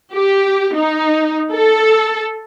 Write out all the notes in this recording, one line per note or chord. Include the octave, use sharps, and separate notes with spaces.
G4
D#4
A4